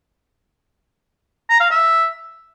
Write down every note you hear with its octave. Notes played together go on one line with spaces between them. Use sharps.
A#5
F5
E5